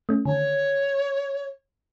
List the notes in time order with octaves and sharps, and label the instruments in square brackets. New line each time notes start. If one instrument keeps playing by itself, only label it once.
[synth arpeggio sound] A3 C#4
[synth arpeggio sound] D3 D#3 [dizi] C#5